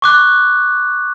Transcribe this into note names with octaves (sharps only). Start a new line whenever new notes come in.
C#6 D6 F#6